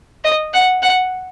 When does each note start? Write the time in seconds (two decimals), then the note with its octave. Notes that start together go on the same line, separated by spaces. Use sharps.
0.24 D#5
0.54 F#5
0.83 F#5